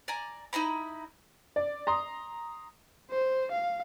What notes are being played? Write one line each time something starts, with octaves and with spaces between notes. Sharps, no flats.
D5 G#5 A#5
D#4 E4 A#5 B5
D5
A#5 C6 D#6
C5
F5